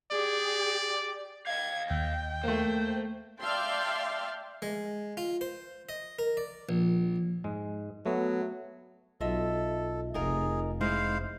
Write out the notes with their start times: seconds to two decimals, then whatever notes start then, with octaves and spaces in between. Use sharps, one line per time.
0.11 G4 G#4 D5
1.47 D#5 F5 G#6
1.90 D#2 G5
2.44 A3 A#3 C5
3.40 D5 E5 F5 G5 A5 C6
4.62 G#3
5.17 F4
5.41 C5
5.89 D#5
6.19 A#4
6.37 D5
6.69 A#1
7.44 G#2 G#3
8.06 F#3 A3 B3
9.21 B1 F4 A4 D#5 E5
10.14 F1 D#4 F4 G#4 A#4
10.81 G#3 D#4 E4 C5 F5